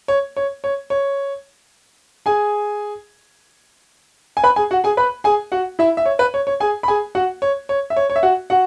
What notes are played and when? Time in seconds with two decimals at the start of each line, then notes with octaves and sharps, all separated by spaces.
0.08 C#5
0.37 C#5
0.64 C#5
0.90 C#5
2.26 G#4 G#5
4.37 G#5
4.43 B4 B5
4.56 G#4 G#5
4.71 F#4 F#5
4.84 G#4 G#5
4.97 B4 B5
5.24 G#4 G#5
5.52 F#4 F#5
5.79 E4 E5
5.97 E5
6.06 C#5
6.19 B4
6.34 C#5
6.47 C#5
6.60 G#4 G#5
6.83 B5
6.88 G#4 G#5
7.15 F#4 F#5
7.42 C#5
7.69 C#5
7.90 E5
7.97 C#5
8.10 C#5
8.16 E5
8.23 F#4 F#5
8.50 F#4 F#5